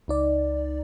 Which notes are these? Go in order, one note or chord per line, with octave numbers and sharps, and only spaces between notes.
C#2 D#4 D5